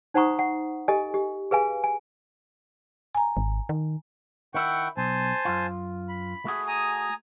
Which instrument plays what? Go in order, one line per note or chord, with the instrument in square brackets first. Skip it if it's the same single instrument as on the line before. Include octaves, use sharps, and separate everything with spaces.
[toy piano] D#4 C5 F#5 A#5 C#6 D#6
F#5
G4 A4 D#5 G#5
G4
G#4 B4 F5 G#5
G#5
[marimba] G#5 A#5
[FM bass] G#1
D#3
[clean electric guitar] D#3 E4 [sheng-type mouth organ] F#5 G5 C#6
[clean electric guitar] B1 [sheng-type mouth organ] C5 G#5 A5
[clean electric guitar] F#2 F4
[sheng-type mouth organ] B5
[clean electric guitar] A3 F#4 G#4
[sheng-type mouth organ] G#5 A#5 D#6